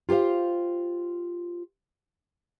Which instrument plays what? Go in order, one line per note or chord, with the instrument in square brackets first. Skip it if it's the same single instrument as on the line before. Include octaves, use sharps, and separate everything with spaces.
[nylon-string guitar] F4 G4 A4 C5 F5